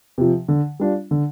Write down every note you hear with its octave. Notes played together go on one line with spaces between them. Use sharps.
C3 F3
D3
G3 D4 F4
D3